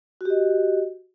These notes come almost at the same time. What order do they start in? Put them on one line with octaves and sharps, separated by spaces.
F#4 G4 D#5